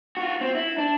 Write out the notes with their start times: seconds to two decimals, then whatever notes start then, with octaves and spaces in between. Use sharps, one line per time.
0.17 F4 F#4
0.41 C4
0.55 E4
0.78 D4